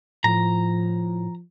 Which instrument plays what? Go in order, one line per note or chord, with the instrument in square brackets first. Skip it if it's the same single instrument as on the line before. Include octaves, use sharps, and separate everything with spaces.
[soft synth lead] A2 [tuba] F3 [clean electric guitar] A#5